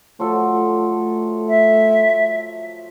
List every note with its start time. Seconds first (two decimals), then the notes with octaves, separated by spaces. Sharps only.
0.20 F3 F#3 A3 A4
1.49 E5